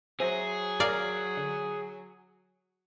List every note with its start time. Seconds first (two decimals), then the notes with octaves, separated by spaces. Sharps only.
0.20 F#3 G#4 C5 E5 A#5
0.80 A#4 D5 F5 A#5 D6
1.37 D3